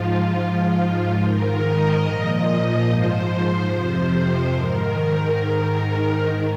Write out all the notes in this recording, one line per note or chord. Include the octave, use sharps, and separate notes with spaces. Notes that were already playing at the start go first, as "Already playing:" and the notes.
Already playing: G#2 F3 F4
G#2 F3
G#2 D#3 A#4
D#5
A#2 F3 D#5
G#2 F3 C5
F2 C3 F3 C5
C5
G#2 D#3 A#4
G#2 D#3
G#2 D#3